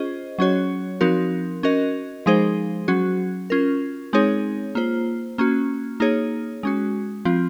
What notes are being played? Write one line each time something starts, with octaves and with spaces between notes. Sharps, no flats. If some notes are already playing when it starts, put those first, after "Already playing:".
Already playing: C#4 F4 G#4 C5 D#5
F#3 C#4 F#4 C#5
F3 C4 D#4 F#4 A#4
C#4 F#4 A#4 D#5
F3 G#3 D#4 G#4 C5
F#3 C#4 F#4
C#4 F4 A#4
G#3 C4 D#4 G#4 C#5
A#3 F4 C5
A#3 C#4 F#4
A#3 D#4 G#4 C#5
G#3 C#4 F#4
F3 C4 F4